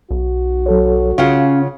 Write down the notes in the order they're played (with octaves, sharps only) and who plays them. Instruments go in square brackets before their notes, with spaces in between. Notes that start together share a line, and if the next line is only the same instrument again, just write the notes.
[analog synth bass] B1 [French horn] F#4
[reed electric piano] F#3 A4 C#5
[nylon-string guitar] C#3 F4 F#5 [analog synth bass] C#4 [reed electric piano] F5